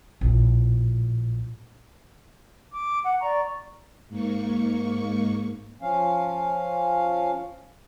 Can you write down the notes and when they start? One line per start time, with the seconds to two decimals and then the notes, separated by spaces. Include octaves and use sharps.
0.21 A#1 A2
2.71 D6
3.03 F#5
3.21 D5 A#5 C#6
4.09 G#2 A#3 C#6
5.82 F3 C#4 F5